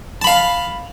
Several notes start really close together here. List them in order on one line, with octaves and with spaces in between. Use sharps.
A5 B5 F5